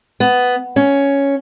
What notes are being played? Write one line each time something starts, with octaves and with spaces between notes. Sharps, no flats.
B3
C#4